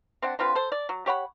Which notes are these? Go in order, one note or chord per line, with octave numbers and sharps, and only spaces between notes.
C4 D4 F#5
D3 C4 F4 B4
A4 C5
D5
F#3
G4 C#5 F#5 B5